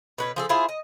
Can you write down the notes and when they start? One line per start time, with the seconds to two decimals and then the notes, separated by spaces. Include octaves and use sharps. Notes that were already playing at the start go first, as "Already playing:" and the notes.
0.18 B2 B4 C#5
0.36 F3 G#4 A4
0.49 E4 F4 G#4 C5
0.69 D#5